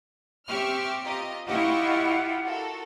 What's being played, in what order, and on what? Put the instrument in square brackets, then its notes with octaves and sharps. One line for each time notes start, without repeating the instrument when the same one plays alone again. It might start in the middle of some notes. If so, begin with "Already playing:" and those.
[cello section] C4 G4 [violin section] E5 C#6 F6
[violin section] F4 D#5 [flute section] A#5
[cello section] E4 G4 [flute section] F4 F5 F#5 [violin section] D#5 C#6
[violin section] F#4 A4 A#4